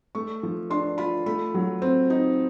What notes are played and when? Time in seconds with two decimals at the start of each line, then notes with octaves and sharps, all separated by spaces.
0.15 A3 C#6
0.43 F3
0.70 D4 C6
0.98 F4 B5
1.26 A3 B5
1.54 F#3
1.82 C4
2.10 D#4